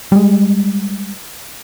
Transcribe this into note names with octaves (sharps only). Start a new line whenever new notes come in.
G3 G#3